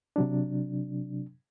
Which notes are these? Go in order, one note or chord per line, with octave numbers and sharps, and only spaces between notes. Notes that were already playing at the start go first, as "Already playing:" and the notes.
C3 F#3 D4